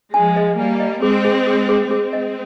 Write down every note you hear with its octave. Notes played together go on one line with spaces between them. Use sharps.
F3 G#3 G#5
D#5
G3 A#3 G#5
D#5
G#3 C4 G#4
G#4
G#4
G#4
G#3 C4 G#4
D#5